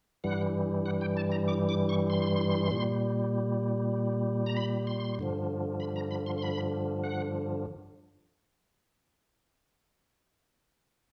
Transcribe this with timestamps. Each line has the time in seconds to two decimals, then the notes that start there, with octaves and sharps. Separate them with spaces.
0.24 G2 E3 G3 F#5
0.86 F#5
1.01 G5
1.17 A5
1.32 A#5
1.48 D6
1.69 D6
1.89 C#6
2.10 C6
2.71 A#2 G3
4.46 A#5
4.56 B5
4.87 C6
5.19 G2 D3 F3
5.80 B5
5.96 A#5
6.11 B5
6.26 C6
6.38 C6
6.42 B5
7.04 F#5